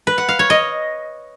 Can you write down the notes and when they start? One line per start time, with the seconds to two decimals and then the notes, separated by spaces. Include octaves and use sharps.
0.07 B4
0.18 F#5
0.29 F5
0.39 C#5
0.50 D#5